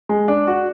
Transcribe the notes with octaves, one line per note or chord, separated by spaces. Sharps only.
G#3
D4
F#4